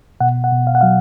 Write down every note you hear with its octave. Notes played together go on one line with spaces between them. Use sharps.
B2 F#5
F#5
B2
F5
F#5
F#3 F5